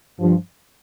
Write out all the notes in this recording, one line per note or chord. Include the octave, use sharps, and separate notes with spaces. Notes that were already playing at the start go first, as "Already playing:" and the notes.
G2 F3